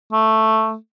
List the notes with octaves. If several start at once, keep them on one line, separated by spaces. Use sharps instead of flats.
A3